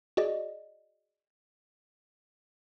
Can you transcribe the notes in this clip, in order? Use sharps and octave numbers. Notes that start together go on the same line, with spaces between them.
F#4 G#4 D5 D#5